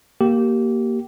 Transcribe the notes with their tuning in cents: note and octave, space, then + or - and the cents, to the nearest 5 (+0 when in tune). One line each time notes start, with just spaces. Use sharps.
A#3 +0 G4 -20